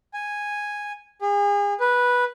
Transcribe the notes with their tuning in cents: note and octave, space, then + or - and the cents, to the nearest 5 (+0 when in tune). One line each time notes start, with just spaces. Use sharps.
G#5 -5
G#4 -35
B4 -10